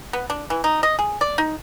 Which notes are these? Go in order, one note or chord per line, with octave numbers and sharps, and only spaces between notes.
B3
D4
E3
D#4
D#5
G#4
D5
D#4